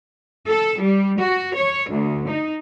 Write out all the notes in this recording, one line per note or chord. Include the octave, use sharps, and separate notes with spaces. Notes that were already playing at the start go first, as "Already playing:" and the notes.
A4
G3
F#4
C#5
D2
D#4